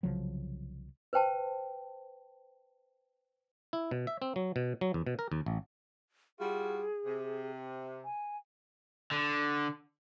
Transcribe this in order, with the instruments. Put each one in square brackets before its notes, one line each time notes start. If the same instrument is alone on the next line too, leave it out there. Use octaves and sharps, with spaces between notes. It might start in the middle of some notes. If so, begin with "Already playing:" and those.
[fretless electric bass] C2 C#3 F3 F#3
[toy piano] B4 C5 G5 A5
[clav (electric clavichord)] E4
B2
E5
C4
F#3
B2
F#3
E2
B2
A#4
D#2
A1
[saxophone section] G3 F4 F#4 [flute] G#4
[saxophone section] C3
[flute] G#5
[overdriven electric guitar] D3